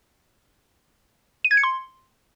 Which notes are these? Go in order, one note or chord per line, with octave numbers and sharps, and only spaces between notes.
D#7
G#6
C#7
C6